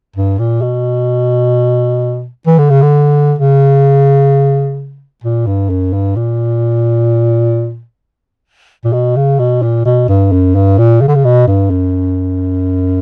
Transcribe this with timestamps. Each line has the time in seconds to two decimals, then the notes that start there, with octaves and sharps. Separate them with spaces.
0.16 G2
0.39 A#2
0.62 B2
2.46 E3
2.58 D3
2.70 C#3
2.82 D3
3.38 C#3
5.24 A#2
5.46 G2
5.69 F#2
5.93 G2
6.16 A#2
8.85 A#2
8.93 B2
9.16 C#3
9.39 B2
9.62 A#2
9.86 B2
10.08 G2
10.32 F#2
10.55 G2
10.78 A#2
11.01 C#3
11.08 D3
11.15 C#3
11.24 B2
11.47 G2
11.70 F#2